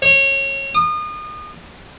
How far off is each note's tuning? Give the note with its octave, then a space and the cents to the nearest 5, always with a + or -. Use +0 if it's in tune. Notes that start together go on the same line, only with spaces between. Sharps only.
C#5 -20
D#6 -35